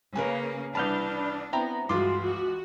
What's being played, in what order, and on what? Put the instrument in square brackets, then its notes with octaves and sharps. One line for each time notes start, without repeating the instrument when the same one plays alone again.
[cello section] C#3 A#3 [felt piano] A#4 B4 G#5
[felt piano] C2 E3 A5 [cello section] D4 [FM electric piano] B5 F6 G6
[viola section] B3 [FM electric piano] C4 E4 A#5 [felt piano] G5
[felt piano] C#2 F4 D6 [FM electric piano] G2 C6 [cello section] E3 [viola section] F#4
[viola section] F#4